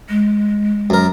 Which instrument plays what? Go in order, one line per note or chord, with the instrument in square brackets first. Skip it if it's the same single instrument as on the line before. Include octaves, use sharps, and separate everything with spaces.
[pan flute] G#3
[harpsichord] F#2 A#4